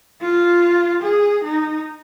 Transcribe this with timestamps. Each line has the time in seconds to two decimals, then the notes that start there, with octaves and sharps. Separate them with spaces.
0.21 F4
1.02 G#4
1.43 D#4